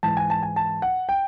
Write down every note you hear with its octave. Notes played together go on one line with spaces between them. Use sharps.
G#2 E3 A5
G#5
A5
G#5
A5
F#5
G5